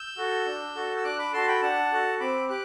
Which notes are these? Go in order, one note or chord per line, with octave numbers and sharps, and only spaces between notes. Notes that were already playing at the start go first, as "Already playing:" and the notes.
Already playing: E6 G6
F#4 A4
D4
F#4 A4
E6
D4 D6 F#6
B5 D6
F#4 A4 A5 C6
G5 B5
D4 F#5 A5
F#4 A4
C4 B5 D6
G4 D6 F#6